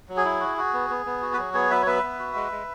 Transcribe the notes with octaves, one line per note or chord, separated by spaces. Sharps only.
F#3
G#4
E4
F#4
F#4
B3
B3
B3
F#4
B4
F#3 G#4
B3 G#4 C#5
F#3 B4 E5
C#5
B3 B4 E5
B3
F#4
G#3
G#3